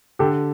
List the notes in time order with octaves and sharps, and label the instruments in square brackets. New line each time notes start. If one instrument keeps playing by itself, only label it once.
[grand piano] D3 [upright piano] G4 A4